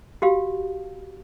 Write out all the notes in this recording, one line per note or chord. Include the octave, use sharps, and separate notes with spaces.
F#4 G4 F5